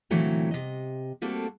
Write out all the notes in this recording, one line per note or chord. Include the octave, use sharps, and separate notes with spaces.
A#2 D3 E3 F#3 A3 C4
C3 D#5
G3 A3 A#3 C4 F#4 A4